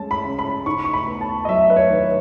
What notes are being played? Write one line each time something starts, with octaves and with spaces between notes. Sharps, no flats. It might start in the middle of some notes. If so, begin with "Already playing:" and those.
Already playing: G#3 C#4 A5
B5
C#3
B5
D#4 C#6
C#6
B5
B3
A5
D#5
F#3 E5
B4
C#5
D#3
B4